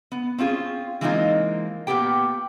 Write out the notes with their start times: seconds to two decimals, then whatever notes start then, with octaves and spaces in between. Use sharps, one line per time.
0.12 B3
0.38 C4 C#4 F4 G#4
1.01 E3 G#3 A#3 C4 D#4 F4
1.87 A#2 A3 B3 G4 G5